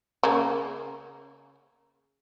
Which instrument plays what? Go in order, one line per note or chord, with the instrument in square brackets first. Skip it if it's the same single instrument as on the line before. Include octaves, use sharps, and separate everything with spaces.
[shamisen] C#3 A#3